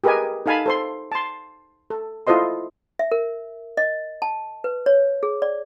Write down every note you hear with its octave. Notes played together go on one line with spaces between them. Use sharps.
G4 G#4 A#4 B4 D#5 G#5
D#4 A4 F5 G#5 A5 B5
A4 C5 C6
A5 C6
A4
E4 F4 A4 C5 D#5 C6
E5
A#4
D#5
A5
B4
C#5
G#4
D5